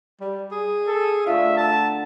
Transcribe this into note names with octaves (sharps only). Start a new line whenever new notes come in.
G3
G#4
A4
D3 A3 F4 E5
A#4 E5 F#5 A5